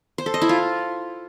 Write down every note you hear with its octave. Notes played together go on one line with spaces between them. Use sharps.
C5
A4
D#5
E4
F4